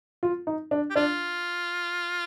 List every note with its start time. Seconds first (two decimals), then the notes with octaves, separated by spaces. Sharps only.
0.23 F4
0.47 D#4
0.71 D4
0.90 G4
0.96 D4 F4